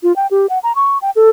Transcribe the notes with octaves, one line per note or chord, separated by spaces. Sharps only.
F4
G5
G4
F#5
A#5
C#6
G5
A4